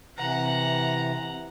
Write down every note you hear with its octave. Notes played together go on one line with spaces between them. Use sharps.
C3 E3 F#5 A#5